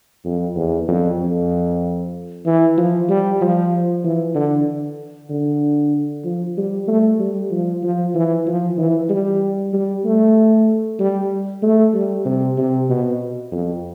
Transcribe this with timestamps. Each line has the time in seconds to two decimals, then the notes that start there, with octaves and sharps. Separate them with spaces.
0.25 F2
0.56 E2
0.88 F2
1.19 F2
2.46 E3
2.78 F3
3.09 G3
3.41 F3
4.04 E3
4.35 D3
5.30 D3
6.25 F3
6.57 G3
6.88 A3
7.19 G3
7.51 F3
7.83 F3
8.15 E3
8.47 F3
8.78 E3
9.10 G3
9.73 G3
10.05 A3
10.99 G3
11.62 A3
11.94 G3
12.25 C3
12.57 C3
12.89 B2
13.52 F2